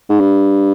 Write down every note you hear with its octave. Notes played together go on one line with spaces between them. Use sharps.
G#2
G2